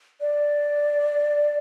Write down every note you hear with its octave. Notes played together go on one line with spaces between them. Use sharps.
D5